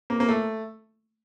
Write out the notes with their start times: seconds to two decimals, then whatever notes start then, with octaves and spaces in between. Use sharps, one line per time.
0.10 A#3
0.20 A#3
0.29 A3